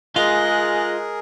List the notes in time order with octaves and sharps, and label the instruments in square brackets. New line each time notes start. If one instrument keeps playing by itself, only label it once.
[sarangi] G#3 [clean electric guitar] F4 [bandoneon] G#4 A#4 [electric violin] F#6 A#6